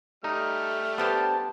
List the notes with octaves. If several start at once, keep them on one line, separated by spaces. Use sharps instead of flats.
G3 A3 D#4 F6
B3 D4 G4 A4 C5